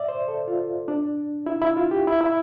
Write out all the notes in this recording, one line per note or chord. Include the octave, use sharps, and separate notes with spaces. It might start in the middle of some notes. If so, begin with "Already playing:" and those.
Already playing: D5 E5
C5
A4
F4
D4
E4
E4
F4
G4
E4
E4